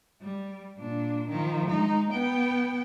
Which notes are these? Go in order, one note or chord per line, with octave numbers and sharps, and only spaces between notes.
G3
A#2 D4
D#3 F3
G#3 D#4
B3 G5